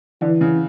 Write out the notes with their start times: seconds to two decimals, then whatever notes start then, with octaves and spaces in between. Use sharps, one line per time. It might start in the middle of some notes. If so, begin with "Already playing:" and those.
0.22 D3 E3
0.41 C#3